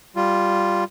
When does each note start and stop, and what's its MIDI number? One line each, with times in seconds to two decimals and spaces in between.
0.16 0.84 55
0.16 0.84 65